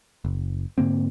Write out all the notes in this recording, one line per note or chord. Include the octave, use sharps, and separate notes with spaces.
F#1
G#2 D3 A#3 C4